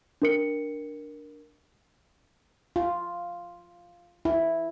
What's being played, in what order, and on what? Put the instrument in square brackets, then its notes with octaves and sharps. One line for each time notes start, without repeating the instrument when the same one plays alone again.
[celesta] D4 A#4 C#7
[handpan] F4
E4